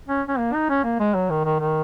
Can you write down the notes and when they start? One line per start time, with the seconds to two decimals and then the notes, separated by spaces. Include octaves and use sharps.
0.09 C#4
0.28 C#4
0.39 A#3
0.53 D#4
0.70 C#4
0.84 A#3
1.00 G#3
1.14 F#3
1.30 D#3
1.45 D#3
1.60 D#3